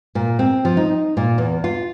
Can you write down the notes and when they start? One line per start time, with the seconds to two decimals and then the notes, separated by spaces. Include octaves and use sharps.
0.15 A#2
0.39 C4
0.65 F3
0.77 D#4
1.17 A#2
1.38 E2
1.64 F4